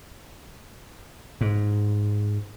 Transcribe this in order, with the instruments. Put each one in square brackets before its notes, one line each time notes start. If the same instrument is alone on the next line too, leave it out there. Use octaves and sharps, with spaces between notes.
[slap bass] G#2